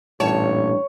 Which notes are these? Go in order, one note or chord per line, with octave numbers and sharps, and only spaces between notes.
A1 G2 A#2 C#5 A5